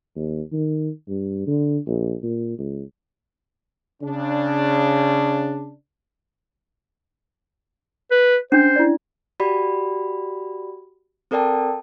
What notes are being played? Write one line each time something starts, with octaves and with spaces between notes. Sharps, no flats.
D#2
D#3
G2
D3
A#1
A#2
C#2
C#3 D4
B4
C#4 D4 C5
E4 D5
F#4 G4 D5 B5
C4 A4 A#4 D5 G5 A5